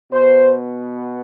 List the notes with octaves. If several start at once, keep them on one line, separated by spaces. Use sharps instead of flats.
B2 B3 C5